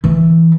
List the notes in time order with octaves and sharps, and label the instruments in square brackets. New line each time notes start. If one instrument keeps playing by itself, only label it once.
[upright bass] E3